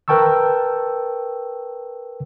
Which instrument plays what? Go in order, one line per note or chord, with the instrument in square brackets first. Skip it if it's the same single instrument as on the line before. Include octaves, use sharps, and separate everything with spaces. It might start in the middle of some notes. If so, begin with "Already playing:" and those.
[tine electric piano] A#4 B4 G5 A5 C#6 E6